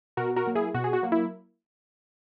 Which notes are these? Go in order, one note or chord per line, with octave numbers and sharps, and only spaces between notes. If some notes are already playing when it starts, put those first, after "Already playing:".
B2 F#4 A#4
F#4 A#4
F#3 A#3
E4 G#4
B2 F#4
G#4
F#4
F#3 A#3
E4